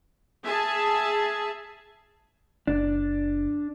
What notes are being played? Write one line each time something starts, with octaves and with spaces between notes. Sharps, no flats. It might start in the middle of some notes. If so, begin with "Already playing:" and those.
G#4 E5 G#5 A5
F#1 D4